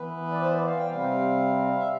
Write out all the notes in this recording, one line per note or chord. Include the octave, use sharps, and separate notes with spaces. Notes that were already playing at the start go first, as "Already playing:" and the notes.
Already playing: E3 B3 B4
D5
C5
D5
F5
G5
C3 G3 C4 F5
E5